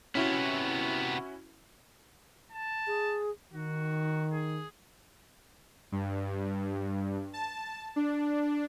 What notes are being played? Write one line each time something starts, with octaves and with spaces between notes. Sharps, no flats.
C3 B3 C#4 E4 F#4
A5
G#4
D#3 D#4 F#4
G#4
G2
A5
D4